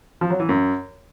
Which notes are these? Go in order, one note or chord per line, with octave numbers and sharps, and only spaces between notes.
F3
F#3
E3
F#2